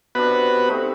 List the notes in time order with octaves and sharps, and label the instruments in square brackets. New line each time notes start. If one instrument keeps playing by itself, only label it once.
[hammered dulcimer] C3 D4 [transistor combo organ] B3 F#4 B4
[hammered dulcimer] A3 C4 D#4